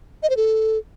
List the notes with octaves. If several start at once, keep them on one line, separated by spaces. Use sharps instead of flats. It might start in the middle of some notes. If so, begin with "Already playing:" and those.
D#5
C5
A4